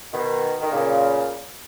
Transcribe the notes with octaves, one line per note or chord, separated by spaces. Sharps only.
B2 D#3
D#3
A#2 C#3